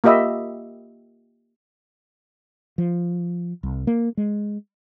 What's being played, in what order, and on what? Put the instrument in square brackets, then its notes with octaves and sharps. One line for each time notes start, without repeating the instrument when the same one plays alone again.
[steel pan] A#3 F4 G4 D#5 E5 B5
[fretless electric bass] F3
C2
A#3
G#3